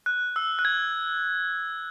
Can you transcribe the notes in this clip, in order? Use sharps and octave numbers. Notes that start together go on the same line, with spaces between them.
F#6
E6
F#6
G#6